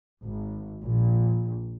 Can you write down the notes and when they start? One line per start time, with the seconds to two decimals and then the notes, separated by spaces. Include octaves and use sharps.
0.25 G#1
0.82 A#1